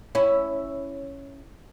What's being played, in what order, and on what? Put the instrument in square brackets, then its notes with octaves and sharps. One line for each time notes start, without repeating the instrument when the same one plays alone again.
[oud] C#4 E4